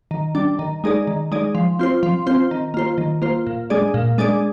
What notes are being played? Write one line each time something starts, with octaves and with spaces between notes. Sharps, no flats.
D#3
G3 D4
D#3
G#3 D#4 G#4 D5
D#3
G#3 D#4 G#4 D5
F3
C4 F4 C5
F3
C4 F4 C5
D#3
A#3 F4 C5
D#3
A#3 F4 C5
A#2
G#3 D4 G#4 D5
A#2
G#3 D4 G#4 D5